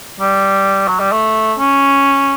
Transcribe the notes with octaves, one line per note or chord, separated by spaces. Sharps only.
G3
F#3
G3
A3
C#4